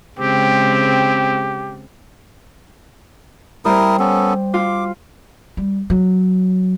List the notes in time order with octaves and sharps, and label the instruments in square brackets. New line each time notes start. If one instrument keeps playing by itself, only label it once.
[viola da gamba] C#3 G#3 [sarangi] C4 [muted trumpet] G4
[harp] G3 C4 [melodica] E4 A#4 D#6
[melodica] B3 C#4 A4
[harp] F4 [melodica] D6
[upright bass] G3
F#3